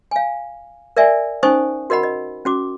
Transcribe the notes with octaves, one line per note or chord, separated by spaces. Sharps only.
F5 G#5
A#4 D5 E5 G#5
C#4 D#4 C5 G#5 C#6 D#6
F#4 A#4 D#5 F#5 B5
D#5
C#4 F#4 D6